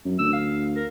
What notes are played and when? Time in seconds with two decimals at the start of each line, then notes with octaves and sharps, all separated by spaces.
0.05 F#2
0.19 D2 E6
0.33 F5
0.76 A#4